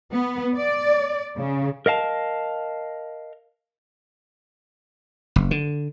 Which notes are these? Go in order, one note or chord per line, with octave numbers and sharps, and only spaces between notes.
B3
D5
C#3
A#4 D#5 F5 A5
F#1
D3